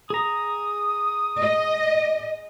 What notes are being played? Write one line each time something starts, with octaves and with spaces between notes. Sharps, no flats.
G#4 A#5 D#6
D#5